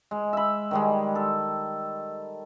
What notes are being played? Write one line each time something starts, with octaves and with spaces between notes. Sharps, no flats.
G#3
E5 B5
D#3 G3 G#3
A4